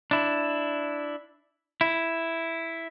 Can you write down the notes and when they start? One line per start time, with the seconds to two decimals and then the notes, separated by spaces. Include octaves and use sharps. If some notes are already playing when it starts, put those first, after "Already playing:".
0.11 D4 E4
1.81 E4